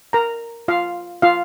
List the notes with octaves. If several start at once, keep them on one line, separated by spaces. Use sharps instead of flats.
A#4 A#5
F4 F5
F4 F5